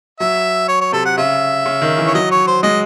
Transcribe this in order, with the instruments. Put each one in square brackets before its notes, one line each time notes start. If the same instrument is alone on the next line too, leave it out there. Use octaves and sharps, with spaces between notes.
[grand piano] F#3 [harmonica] E5
[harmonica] C#5
C#5
[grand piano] C3 [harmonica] A4
[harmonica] F#5
[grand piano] C#3 [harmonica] E5
[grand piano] C#3
D#3
E3
[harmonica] C#5
[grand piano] F#3 [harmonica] D#5
[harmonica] C#5
C5
[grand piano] G#3 [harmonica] D#5